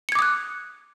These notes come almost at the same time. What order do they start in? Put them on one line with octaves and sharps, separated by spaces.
C#7 G#6 D6 D#6 F#6